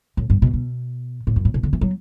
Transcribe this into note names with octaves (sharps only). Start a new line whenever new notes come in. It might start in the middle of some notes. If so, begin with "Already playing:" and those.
A2
G2
B2
B2
A2
F#2
A2
B2
D3
E3
F#3